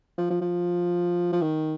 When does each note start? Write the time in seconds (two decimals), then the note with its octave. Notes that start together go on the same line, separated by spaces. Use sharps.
0.18 F3
0.30 F3
0.41 F3
1.32 F3
1.42 D#3